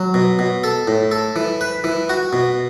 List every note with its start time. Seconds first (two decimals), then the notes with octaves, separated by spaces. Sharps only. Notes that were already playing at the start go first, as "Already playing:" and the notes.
Already playing: F#3
0.14 B2
0.39 B2
0.64 A4
0.88 A2
1.11 A4
1.36 E3
1.61 B4
1.84 E3
2.09 F#4
2.33 B2